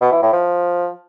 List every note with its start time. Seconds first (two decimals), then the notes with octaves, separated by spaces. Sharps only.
0.01 B2
0.12 E3
0.22 A2
0.33 F3